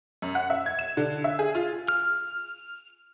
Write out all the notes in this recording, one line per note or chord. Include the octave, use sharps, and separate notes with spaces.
F#2
F#5
E5
G#6
E7
D3
E5
G#4
F4
F6